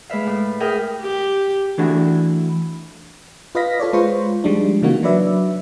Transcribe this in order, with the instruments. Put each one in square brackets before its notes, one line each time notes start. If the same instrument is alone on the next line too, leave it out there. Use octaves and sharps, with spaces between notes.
[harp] G#3 B4 E5 F5
A2
G#4 A#4 E5 G5 D#6
[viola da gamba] G4
[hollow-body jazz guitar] E3 A3 D4 E4 F#4
[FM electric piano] F4 B4 D#5 F5 A#6 B6
F4 A4 C#5 D5
G#3 F4 B4 C5 C#6
F3 G3 G#3 D4 D#4
C#3 E3 A#3 D#4 F#4
F#3 D4 B4 D5 E5